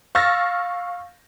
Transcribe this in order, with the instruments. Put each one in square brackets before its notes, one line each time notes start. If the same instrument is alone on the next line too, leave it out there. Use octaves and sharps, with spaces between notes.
[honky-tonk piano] F5 C#6 E6 F6 A6 A#6